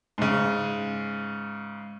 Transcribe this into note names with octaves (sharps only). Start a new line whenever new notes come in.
G#2 C#3